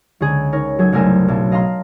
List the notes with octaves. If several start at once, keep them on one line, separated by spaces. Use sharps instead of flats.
C#2 D3 G#4
D#4 A#4 C#5
F#3 G#4 A4 G#6
F#1 C2 A3 A#4 G#5 E7
B1 B2 D4 A5
D#5 F5 A5 A#5 C6 F6